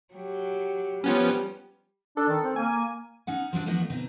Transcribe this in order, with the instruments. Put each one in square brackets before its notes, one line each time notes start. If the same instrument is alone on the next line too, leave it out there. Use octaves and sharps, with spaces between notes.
[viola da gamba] F#3 G4
[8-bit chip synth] F3 B3 C#4 [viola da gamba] G3
[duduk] D4 [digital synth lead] A4
[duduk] D#3
C4
[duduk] A#3 [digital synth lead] G#5
[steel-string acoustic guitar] C#4 D#4 F#5
F3 F#3 B3 D4
E2 F3 A3 B3 D4 D#5
B2 D3 C4 D#4